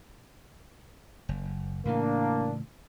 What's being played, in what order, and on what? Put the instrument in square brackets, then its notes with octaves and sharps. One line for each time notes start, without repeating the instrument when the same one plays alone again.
[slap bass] F#1
[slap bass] A2 C#3 E3 [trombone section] A#3 D4